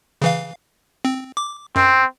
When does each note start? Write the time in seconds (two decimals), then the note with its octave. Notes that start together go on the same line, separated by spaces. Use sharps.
0.22 C#3 E3 F5
1.05 C4
1.37 D6
1.76 F#2 C4